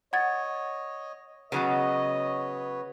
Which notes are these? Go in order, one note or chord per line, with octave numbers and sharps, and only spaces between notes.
C#5 D#5 F#5 G#6 A6
C#3 F#3 B3 B4 C#5 D#5